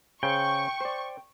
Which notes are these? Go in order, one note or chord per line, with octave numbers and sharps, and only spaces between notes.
C#3 C5 G5 C#6
C5 D5